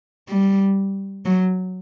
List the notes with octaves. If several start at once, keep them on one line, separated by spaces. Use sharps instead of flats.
G3
F#3